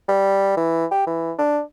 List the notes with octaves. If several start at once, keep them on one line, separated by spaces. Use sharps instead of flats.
G3
E3
G4
E3
D4